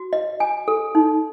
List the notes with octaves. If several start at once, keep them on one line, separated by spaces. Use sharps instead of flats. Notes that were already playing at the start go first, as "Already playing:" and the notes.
Already playing: F#4
D#5
G#5
A4
D#4